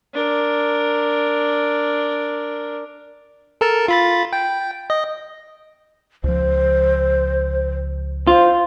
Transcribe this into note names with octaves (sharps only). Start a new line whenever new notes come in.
D4 A#4
A4 A#4 A5
F4 B5 A6
G5
D#5
C#2 F3 C5
F4 C5